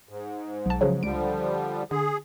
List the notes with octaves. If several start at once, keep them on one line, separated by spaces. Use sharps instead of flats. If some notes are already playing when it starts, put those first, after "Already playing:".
G#2
B1 A5
C#3 F3 F#3
C#2 D3 F3 G3 D7
D3 G#4